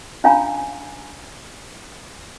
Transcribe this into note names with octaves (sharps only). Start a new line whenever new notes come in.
C#4 D4 F4 F5 G#5 A#5